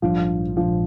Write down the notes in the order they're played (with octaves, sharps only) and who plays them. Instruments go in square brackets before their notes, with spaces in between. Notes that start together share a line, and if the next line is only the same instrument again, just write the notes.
[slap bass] A#1 G#2 G3 D4 [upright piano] F3
[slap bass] A#1 G#2 G3 D4 [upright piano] F3